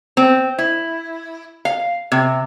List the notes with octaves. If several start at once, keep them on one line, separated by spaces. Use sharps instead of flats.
C4
E4
F5
C3